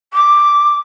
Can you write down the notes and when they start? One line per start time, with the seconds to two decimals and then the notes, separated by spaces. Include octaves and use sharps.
0.13 D6